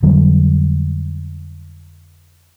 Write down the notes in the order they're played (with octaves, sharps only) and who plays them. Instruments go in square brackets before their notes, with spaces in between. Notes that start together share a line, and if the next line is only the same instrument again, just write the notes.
[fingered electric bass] F2 D3 F#3 G3